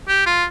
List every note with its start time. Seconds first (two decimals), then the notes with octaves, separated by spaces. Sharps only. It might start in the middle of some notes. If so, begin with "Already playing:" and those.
0.08 G4
0.26 F4